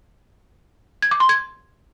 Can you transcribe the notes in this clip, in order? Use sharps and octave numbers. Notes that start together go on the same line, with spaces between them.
G#6
D6
C6
G#6